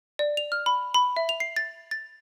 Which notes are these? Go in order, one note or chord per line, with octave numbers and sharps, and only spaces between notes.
D5
F7
F6
B5
B5
E5
F7
C7
A6
A6